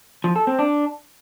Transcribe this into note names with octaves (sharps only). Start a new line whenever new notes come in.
F3
A4
C4
D4